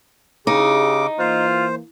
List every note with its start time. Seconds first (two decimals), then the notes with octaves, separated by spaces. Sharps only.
0.47 C#3 D#4 G4 G#4 D6
1.19 E3 A#3 F4 C5